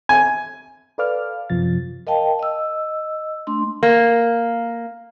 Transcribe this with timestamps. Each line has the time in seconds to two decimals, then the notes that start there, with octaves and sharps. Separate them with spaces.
0.09 G#5
0.98 A4 B4 D5 F5 D6 F6
1.50 F#2 C3 F3 A6
2.07 A#4 D#5 F5 G5 A5
2.39 D#5 E6
3.47 A3 D4 C6
3.83 A#3